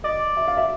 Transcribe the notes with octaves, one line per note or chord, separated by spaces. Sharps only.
D5 D#5
E5
F5
E5